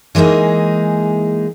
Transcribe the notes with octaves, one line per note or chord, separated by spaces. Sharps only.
E3 G#3 A#3 D#4 G#4